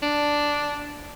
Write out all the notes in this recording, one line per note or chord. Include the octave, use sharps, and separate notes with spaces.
D4